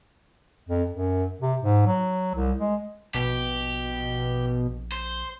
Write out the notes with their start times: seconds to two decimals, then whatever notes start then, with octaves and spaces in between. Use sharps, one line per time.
0.69 F2
0.91 F#2
1.41 C3
1.62 G#2
1.87 F#3
2.35 C2
2.58 G#3
3.15 A#1 B2 G4
4.92 C5